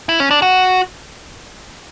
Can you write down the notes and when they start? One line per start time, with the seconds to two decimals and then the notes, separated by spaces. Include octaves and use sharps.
0.09 E4
0.20 C#4
0.31 D4
0.42 F#4